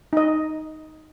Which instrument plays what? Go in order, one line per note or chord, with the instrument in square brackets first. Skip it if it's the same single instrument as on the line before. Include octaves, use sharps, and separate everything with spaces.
[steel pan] D#4 D#5